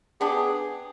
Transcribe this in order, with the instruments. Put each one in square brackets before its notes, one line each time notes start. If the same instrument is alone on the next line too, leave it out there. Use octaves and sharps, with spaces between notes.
[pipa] B3 D4 G4 [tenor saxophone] G#4